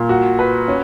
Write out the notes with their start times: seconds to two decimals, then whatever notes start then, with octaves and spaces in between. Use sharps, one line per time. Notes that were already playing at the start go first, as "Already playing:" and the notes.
Already playing: A#2
0.09 F#4
0.39 B4
0.68 C#4